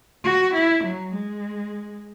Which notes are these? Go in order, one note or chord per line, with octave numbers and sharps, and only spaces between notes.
F#4
E4
F#3
G#3